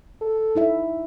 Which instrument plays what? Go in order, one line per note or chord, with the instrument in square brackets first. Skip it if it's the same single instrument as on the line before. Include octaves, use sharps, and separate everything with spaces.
[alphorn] A4
[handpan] D#4 E4 E5